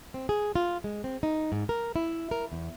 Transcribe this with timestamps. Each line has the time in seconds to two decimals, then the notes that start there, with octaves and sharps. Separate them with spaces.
0.14 C4
0.29 G#4
0.56 F4
0.84 G#3
1.04 C4
1.23 D#4
1.52 G#2
1.69 A#4
1.96 E4
2.31 A#4
2.52 E2